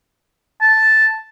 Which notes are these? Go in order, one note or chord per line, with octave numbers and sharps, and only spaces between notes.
A5